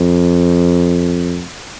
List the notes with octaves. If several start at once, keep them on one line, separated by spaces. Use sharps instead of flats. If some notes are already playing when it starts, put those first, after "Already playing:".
Already playing: F2